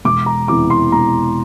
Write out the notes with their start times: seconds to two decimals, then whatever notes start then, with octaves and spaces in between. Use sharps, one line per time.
0.05 E1 D6
0.26 A#5
0.48 E2 C3 E3 D6
0.70 C6
0.92 E1 A#5